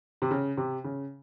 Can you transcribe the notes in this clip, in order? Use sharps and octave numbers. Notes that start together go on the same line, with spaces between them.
C3
C#3
C3
C#3